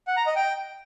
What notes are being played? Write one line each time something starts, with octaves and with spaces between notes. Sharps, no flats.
F#5
A#5
D#5
G5